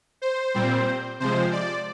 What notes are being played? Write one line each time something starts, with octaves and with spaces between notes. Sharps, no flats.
C5
A#2 G3 C4
C3 F3 G#3 C5
D5